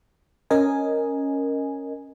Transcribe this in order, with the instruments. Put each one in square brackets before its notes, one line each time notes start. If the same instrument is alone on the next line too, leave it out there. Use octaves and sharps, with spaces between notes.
[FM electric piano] C#4 A#4 D#5 G#5